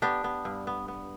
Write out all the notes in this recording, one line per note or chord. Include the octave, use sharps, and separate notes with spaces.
B3 D4 G4
B3
G2
B3
B3